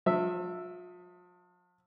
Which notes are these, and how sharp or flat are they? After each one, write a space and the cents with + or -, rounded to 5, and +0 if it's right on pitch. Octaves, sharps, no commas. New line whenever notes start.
F3 +40 E5 +0